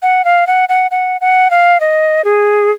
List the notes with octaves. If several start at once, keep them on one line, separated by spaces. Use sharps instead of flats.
F#5
F5
F#5
F#5
F#5
F#5
F5
D#5
G#4